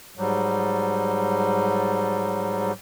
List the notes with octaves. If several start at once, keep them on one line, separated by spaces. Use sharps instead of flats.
G#2 F#3 G3